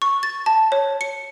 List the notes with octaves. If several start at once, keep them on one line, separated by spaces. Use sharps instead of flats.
C#6
A6
A5
C#5
C#7